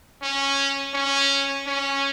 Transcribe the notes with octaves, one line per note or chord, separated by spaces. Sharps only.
C#4
C#4
C#4